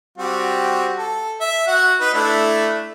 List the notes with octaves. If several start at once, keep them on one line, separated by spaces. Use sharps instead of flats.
G3 C4 F#4
A4
E5
F#4 F#5
D#4 B4
A3 D4 E4